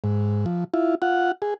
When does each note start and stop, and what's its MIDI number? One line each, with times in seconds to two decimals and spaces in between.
0.04 0.45 44
0.46 0.64 53
0.74 0.95 64
0.74 0.95 65
1.02 1.32 65
1.02 1.32 78
1.42 1.54 68